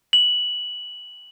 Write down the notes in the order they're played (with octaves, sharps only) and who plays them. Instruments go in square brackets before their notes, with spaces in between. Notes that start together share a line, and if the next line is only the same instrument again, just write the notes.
[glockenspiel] F#7